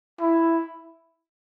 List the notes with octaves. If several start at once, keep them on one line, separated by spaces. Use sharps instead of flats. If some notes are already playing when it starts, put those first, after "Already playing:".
E4